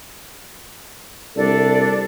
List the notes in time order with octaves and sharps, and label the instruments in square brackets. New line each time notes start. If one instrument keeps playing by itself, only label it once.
[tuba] C2 [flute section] D4 A4 D5